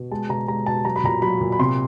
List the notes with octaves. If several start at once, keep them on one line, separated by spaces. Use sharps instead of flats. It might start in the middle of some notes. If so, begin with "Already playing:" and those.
Already playing: B2
G#3 A5
B2 A#5
G#3 A#5
B2 A5
F#3 A#5
B5
A#2 A#5
F#3 B5
A#2
B5
C3 C6